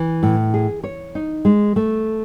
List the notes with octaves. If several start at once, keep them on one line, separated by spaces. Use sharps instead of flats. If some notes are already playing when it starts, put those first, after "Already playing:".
Already playing: E3
A2
G#4
C#5
D#4
G#3
A3